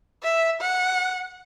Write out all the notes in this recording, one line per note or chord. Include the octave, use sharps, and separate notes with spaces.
E5
F#5